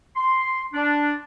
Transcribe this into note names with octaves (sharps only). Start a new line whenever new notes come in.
C6
D4